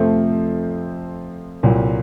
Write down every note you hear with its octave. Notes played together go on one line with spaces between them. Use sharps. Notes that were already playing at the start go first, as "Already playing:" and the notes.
Already playing: F2 C3 F3 A3 C4
C2 A#2 F#3